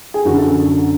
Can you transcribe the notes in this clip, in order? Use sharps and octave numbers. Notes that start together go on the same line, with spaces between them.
G#4
F#2 D3 F#4
A4